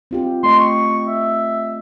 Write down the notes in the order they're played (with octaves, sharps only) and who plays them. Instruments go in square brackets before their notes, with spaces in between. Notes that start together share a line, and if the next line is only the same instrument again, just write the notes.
[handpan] C4 F4 G4
[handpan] A3 D#5 [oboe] C6
[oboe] C#6
E5